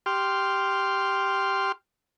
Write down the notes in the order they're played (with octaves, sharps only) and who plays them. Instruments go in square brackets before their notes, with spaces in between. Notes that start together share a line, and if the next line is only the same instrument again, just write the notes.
[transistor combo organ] G4 C6 F6